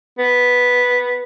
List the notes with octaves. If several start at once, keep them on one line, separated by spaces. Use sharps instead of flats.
B3